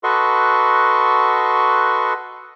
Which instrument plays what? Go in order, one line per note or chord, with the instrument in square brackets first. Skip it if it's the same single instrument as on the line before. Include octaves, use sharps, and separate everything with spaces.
[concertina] F#4 A4 B4 D#5 C6 C#6